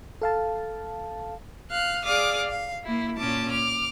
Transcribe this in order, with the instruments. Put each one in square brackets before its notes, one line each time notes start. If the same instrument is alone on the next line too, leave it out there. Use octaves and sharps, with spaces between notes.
[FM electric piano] A4 F5 A5
[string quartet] F5 F#6
G#4 D5 F5 D6 D#6
F5
A#3 E4
A#2 C#4 A5 D6
D6 F6